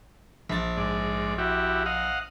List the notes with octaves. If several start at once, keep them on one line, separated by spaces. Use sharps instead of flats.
A#1 A6
G#2 D5
E4 F#4 G4
D#5 F5 F#5